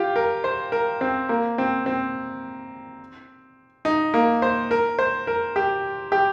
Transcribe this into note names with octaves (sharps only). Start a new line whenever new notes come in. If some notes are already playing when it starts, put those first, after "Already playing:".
Already playing: F4 G4
A#4
C5
A#4
C4
A#3
C4
C4
D#4
A#3
C5
A#4
C5
A#4
G4
G4